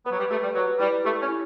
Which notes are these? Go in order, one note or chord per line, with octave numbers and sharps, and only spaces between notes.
B3 B4
F#3
G3
A3 G4
G3
F#3 B4
G3 E4
A3 G4
C#4
E4